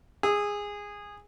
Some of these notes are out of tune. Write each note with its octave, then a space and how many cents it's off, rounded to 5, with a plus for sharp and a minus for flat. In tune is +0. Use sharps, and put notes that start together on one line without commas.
G#4 -15 E6 -25